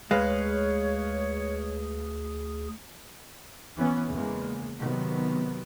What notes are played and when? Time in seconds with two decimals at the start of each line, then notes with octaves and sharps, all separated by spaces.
0.11 D2 G#3 G#4 B4 C#5 F5
3.77 E3 B3 C#4
4.11 E2 C#3 G#3 A#3
4.80 C3 D#3 F#3 B3